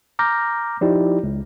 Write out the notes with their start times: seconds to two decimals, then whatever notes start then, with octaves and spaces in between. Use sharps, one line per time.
0.19 A#5 D6 F6 G6 A#6
0.81 F3 D#4 E4 G4 D5
1.23 C#2